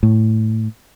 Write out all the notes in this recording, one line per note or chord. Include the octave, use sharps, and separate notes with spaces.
A2